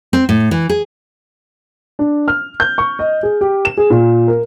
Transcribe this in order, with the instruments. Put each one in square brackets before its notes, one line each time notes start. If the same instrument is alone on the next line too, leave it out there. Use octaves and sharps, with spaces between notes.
[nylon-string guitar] C4
A2
E3
G#4
[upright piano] D4
F6
G6
C#6
D#5
G#4
G4
E7
G#4
A#2
A#4